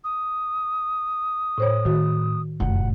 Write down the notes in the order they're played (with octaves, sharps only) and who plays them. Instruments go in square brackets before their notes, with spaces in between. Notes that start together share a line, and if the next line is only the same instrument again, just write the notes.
[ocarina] D#6
[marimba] A2 C5 C#5
[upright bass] A2 [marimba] D#3 F#4
[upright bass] F1 A2 [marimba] F#2 [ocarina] F#5